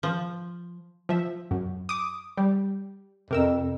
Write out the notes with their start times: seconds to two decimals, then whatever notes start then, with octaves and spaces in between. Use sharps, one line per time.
0.03 F3
1.09 F3 E5
1.51 F#2
1.89 D6 D#6
2.37 G3
3.31 F2 C3 A#4 E6